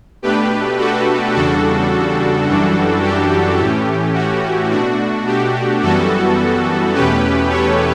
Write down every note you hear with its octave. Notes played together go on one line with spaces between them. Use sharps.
B2 A3 D4 G4 B4
F#4 A4
E2 C#3 G3 D4 F#4 A4
F#2 E3 G3 D4
G4
A2 E3 A3 C#4 G4
F#4
B2 A3 D4 F#4
G4
F#2 E3 G3 B3 F#4 A4
E2 B2 A3 C#4 G4 B4
A4 C#5